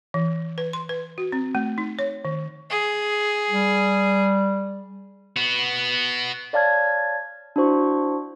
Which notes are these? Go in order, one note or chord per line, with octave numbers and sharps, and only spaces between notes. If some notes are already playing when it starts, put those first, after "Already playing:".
E3
B4
C6
B4
F#4
C4
A3
D#4
C#5
D#3
G#4
G3
B3 F#4
C#5 D5 F5 A5 F6 G#6
D4 E4 F#4 C5 C#6